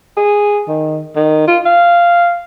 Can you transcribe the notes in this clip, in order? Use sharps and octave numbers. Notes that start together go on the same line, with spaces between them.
G#4
D#3
D#3
F4
F5